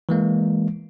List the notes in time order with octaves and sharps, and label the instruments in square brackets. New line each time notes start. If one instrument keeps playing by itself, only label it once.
[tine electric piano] E3 G#3 A#3